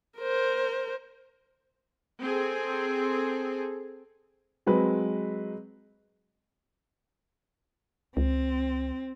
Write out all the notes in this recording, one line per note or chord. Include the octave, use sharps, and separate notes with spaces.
A#4 C5
C4 G#4 A4
F#3 G#3 C4 B4
C#2 C4